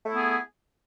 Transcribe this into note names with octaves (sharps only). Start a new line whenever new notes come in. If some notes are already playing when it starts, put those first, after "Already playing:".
A3 B3 E4 G#4